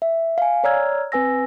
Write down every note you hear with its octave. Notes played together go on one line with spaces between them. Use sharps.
E5
F5 G#5
C#5 D5 A#5 E6 F6 G#6
C4 B4 G#5 E6 A#6